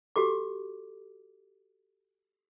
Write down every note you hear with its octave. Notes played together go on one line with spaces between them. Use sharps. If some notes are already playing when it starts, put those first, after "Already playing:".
F#4 G4 A4 D6